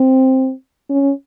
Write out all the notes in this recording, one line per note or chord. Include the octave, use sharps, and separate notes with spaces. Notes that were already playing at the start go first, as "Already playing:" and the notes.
Already playing: C4
C#4